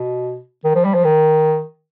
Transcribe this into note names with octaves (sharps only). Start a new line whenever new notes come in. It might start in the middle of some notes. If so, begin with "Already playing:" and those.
Already playing: B2
D#3
F3
G3
F3
D#3